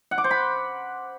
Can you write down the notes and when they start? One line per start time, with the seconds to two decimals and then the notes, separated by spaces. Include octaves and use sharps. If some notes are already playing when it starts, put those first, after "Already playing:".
0.11 F#5
0.18 D6
0.24 C5
0.31 B5